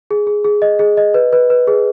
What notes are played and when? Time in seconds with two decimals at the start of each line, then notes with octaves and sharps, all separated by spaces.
0.11 G#4
0.27 G#4
0.45 G#4
0.62 D#5
0.79 G#4
0.97 D#5
1.14 B4
1.33 B4
1.50 B4
1.67 G#4